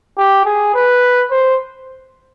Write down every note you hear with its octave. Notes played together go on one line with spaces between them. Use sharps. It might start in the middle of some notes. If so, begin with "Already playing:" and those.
G4
G#4
B4
C5